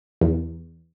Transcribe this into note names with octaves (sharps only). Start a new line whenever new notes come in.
E2